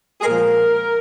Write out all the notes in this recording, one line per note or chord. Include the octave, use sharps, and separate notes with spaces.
G#4
A#2 F3 G#3 A#4